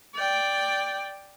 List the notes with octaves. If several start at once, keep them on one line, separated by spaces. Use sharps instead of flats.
D5 G5